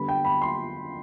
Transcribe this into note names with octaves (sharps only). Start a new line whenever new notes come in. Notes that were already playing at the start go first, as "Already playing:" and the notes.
Already playing: D3 G3 B3 B5
G5
B5
C6